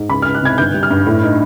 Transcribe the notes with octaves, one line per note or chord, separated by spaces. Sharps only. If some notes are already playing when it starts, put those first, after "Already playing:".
Already playing: G#2
C#2 B5
C#2 F6
F#6
C3 G#6
G1 G6
G3
F6
G2
A2
D#4